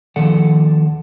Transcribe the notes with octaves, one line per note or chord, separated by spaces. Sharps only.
D#2 D#3 F3 A4 D5 F#5